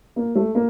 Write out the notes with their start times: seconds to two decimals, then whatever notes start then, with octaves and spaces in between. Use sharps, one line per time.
0.16 A#3
0.35 A3
0.55 A#3